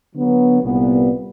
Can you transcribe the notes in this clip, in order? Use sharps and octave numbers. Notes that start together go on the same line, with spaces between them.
D3 F#3 B3
C2 A#2 G3 B3